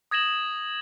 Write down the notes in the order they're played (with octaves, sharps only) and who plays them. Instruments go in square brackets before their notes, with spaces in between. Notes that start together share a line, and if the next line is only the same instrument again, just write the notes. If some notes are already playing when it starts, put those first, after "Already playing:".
[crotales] D#6 G#6 A#6 E7 F#7